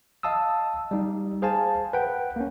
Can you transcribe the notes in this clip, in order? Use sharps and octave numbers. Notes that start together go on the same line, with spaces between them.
D#5 F5 A5 D#6 E6
G3 D#4
G#4 C5 F5 G#5 A5
B4 F#5 G5
A#3 C#4